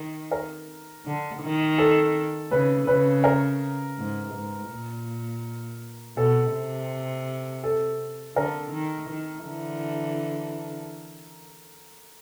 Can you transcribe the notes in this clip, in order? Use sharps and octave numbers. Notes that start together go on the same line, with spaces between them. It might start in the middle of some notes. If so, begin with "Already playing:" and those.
Already playing: D#3
A#4
D3
D#3
A4
C#3 B4
C#3 B4
A#4
G#2
G#2
A#2
B2 A4
C3
A4
D3 A#4
D#3
D#3
D3 E3